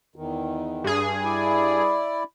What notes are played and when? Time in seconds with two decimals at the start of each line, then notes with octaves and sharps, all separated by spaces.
0.16 E2 D#3
0.84 G2 G#4
1.24 E4 D5